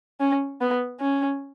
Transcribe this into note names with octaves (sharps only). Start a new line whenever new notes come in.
C#4
B3
C#4